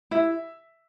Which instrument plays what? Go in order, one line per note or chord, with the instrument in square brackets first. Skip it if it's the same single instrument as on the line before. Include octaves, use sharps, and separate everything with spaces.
[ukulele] E4 [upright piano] E5